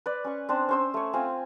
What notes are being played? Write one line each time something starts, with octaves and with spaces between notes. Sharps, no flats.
B4 D5
C#4 C#6
C4 D4 C5
C#4 C5 E6
A3 C#5
C4 F4 G#5